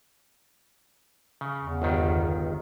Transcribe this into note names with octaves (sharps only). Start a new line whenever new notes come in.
C#3
E2
G1 C#2 D#3